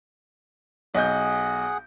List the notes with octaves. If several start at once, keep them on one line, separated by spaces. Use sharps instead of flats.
B1 G#4 D#5 F#5 G6